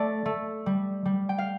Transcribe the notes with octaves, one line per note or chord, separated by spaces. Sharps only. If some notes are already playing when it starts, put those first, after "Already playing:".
Already playing: A3 D5
A3
G3
G3
G5
F5